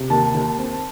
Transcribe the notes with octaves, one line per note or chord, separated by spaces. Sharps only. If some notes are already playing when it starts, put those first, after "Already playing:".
Already playing: C3
D#2 A5
D#2
C4